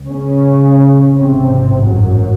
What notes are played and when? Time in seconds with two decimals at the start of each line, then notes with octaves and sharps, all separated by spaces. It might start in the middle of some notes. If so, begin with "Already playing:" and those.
Already playing: C#2
0.08 C#3 C#4
1.14 A1 G#2 C3 C4
1.85 F#2 F#3